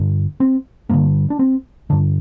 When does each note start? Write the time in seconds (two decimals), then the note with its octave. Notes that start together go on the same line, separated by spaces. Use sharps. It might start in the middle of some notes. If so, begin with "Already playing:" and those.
Already playing: G2 D3
0.40 C4
0.89 G2 D3 A#3
1.30 D4
1.39 C4
1.90 G2 D3 D4